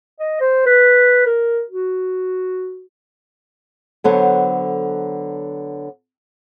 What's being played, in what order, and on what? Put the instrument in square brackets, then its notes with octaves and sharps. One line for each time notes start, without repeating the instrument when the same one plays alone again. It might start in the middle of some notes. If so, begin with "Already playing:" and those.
[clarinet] D#5
C5
B4
A#4
F#4
[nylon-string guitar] D3 F#3 B3 A4 C5 C#5